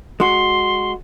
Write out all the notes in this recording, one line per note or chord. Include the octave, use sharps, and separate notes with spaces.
G#3 F#4 C6